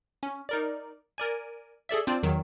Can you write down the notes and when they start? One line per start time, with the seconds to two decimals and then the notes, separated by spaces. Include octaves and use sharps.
0.23 C#4
0.49 D#4 A#4 D5
1.18 A#4 D5 G#5
1.89 G#4 A4 D5 E5
2.07 C4 D4 F4 C5 D5
2.23 E2 D#3 F#3